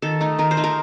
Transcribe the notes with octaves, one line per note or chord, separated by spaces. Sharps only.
D#3 A4
A3 D#4
D#3 A#4
C5
A3 D#4
A#4